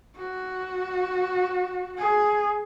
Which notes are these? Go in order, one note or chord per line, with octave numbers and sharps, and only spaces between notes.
F#4
G#4